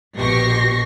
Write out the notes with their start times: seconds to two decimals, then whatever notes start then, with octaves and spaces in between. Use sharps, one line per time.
0.16 A#1 B2 G4 C#6 A#6 C7